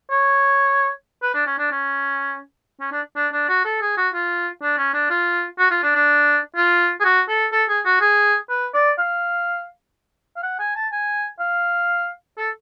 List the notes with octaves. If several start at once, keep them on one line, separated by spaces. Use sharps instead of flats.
C#5
B4
D4
C#4
D4
C#4
C#4
D4
D4
D4
F#4
A4
G#4
F#4
F4
D4
C#4
D4
F4
F#4
F4
D4
D4
F4
G#4
F#4
A4
A4
G#4
F#4
G#4
B4
D5
F5
F5
F#5
G#5
A5
G#5
F5
A4